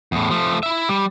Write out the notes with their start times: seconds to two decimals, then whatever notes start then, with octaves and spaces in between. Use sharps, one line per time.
0.12 E2 A2
0.30 F3 A3
0.63 E4 E5
0.89 G3